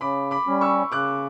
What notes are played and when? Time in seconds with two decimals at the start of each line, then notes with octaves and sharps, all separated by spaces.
0.01 C#3 B5 D6
0.31 B5 D6
0.47 G3 C#4
0.61 C#6 E6
0.92 C#3 D6 F#6